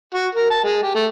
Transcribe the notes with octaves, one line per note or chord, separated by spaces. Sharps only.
F#4
A#4
A5
G#3
G4
A3